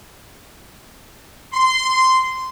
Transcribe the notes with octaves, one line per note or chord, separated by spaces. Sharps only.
C6